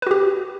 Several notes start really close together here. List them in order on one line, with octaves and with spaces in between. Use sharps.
B4 F#4 G4